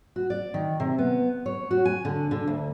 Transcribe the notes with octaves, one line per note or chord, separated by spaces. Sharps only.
F#4
D5
D#3
C3
B3
C#5
F#4
G#5
D3
D3
D2